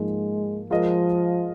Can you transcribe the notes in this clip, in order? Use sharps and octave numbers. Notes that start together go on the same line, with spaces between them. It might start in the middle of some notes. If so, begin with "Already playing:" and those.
Already playing: G#2 F3 G#3 A#3
F3 G#3 F4 A#4 D#5